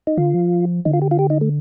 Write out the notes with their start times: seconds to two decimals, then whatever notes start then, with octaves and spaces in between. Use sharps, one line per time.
0.07 D#4
0.18 D3 F4
0.34 F3
0.85 D3 D#4
0.93 F4
1.02 G4
1.11 F4
1.19 G4
1.30 D#4
1.41 A3